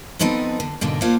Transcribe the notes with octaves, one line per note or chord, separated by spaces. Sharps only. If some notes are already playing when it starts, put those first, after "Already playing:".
F3 B3 C4 D#4 A4 B4
D3
G#2 B2 D3 A#3
A#3 D4 F4 C5 F5 F#5